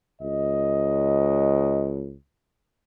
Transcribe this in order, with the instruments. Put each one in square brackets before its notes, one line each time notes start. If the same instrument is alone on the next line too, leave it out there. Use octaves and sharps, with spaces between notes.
[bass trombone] C#2 [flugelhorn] D#5